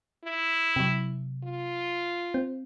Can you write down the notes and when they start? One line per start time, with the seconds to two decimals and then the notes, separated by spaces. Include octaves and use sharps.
0.24 E4
0.76 C3 F#3
1.44 F4
2.34 C4